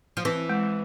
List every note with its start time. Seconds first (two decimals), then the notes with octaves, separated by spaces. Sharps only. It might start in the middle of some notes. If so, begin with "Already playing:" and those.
0.17 F3
0.25 E3 C4
0.49 G#3